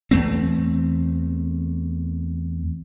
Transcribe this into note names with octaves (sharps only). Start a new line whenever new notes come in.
E2 A3 C4